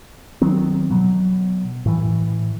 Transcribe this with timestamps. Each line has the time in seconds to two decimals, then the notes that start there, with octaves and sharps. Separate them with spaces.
0.41 D#3 F#3 B3 C4
0.91 B2 F#3
1.86 A2 E3